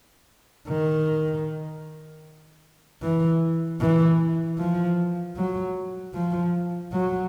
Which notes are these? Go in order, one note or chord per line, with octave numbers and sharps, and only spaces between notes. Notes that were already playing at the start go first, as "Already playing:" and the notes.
D#3
E3
E3
F3
F#3
F3
F#3